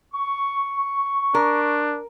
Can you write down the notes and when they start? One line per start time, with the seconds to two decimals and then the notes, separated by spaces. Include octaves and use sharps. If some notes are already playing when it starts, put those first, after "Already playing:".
0.13 C#6
1.35 D4 A#4